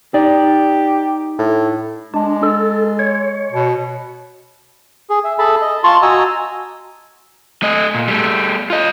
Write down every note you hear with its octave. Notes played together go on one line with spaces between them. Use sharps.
D#4 G4 D5
A2
G#3 D4
A4
C#5
B2
G#4
E5
G#4 A4 E5 A5 B5
D#5
F4 A5 C6 C#6
F#4 D#5 G#5 A#5 E6
A3 D#5
A#2
G3 A3
F4 D#5